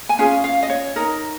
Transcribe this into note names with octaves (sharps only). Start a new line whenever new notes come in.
G#5
C#4 F4 G#4 F5
F5
D#5
C#5
D#4 A#4